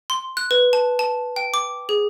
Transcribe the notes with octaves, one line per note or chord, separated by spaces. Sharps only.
C6
F#6
B4
A5
A5
G5
D6
G#4